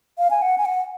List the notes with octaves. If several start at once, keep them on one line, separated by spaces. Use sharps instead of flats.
F5
G#5
F#5
G#5
F#5